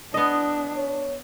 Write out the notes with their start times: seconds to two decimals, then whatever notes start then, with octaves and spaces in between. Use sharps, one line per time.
0.14 B3 D4 D#5
0.76 C#5